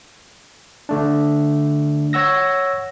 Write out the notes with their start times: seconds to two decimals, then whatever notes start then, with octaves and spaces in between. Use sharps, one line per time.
0.89 D3 A3 D4
2.13 C#5 F#5 E6 A#6